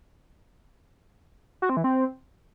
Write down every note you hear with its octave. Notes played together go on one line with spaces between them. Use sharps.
F#4
C4
E3
C4